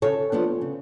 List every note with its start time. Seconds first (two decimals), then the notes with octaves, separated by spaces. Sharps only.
0.02 C#3 A4 C#5
0.32 F3 B3 D4
0.61 C#3